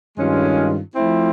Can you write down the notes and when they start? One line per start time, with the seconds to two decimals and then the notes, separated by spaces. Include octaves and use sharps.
0.17 G2 D#3 G#3 C#4 F4
0.95 F3 A3 C4 E4